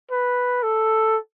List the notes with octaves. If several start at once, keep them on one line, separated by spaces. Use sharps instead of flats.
B4
A4